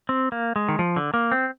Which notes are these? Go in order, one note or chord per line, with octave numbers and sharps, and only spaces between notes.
C4
A#3
G#3
D#3
F3
D3
A#3
C4